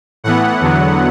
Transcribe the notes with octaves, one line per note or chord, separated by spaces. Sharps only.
A2 E3 B3 F#5
E2 D3 F#3 B3